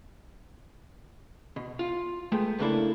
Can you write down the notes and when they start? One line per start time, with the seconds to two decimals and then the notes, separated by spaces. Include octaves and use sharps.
1.56 B2
1.79 F4
2.32 G#3 A3 B3 G5
2.59 C#3 A3 A#3 D4 E4 A4